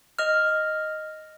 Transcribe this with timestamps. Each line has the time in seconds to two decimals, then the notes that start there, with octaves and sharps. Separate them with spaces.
0.19 D#5 F6